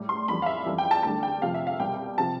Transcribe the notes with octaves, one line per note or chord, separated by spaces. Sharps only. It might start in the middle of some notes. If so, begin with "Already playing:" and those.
Already playing: A2 G3
C6
F2 E3 G3 B5
F5
E5
F2 E3 G3
G5
A5
D2 D3 G3 A5
G5
F2 C3 F3 F5
E5
F5
C2 B2 G3 G5
C3 F3 A5